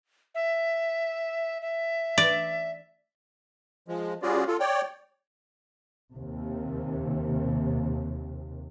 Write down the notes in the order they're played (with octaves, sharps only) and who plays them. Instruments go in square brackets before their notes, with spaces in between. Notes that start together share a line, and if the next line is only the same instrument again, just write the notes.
[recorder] E5
E5
[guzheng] D5
[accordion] F3 G#3
G3 C#4 F4 F#4 G#4 D5
F4 A4
C#5 D5 G5
[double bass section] D#2 C3